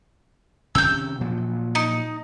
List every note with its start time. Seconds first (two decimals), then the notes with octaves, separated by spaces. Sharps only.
0.75 C3 D#3 C#4 E6 G6
1.21 A#2 F3 F#3
1.75 D#4